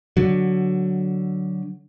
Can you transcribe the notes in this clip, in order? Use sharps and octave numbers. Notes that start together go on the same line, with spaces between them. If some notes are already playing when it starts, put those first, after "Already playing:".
D3 F#3